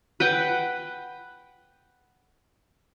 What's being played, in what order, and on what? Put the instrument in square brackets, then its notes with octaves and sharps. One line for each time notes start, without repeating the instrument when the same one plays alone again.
[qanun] B4 F#5 G5